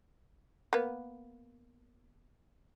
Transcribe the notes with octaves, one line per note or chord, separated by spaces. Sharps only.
A#3 B3